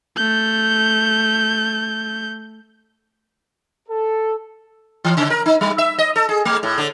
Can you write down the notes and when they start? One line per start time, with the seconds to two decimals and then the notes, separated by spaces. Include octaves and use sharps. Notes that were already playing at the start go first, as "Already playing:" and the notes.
0.17 A3 G6
3.89 A4
5.04 E3
5.17 C#3
5.30 A#4
5.46 D#4
5.61 G3
5.78 E5
5.98 D#5
6.16 A4
6.29 G#4
6.45 A3
6.63 A2
6.78 D3